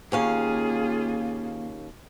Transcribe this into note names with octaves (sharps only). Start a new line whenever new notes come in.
D#2 A#3 C#4 F4 G#4 F5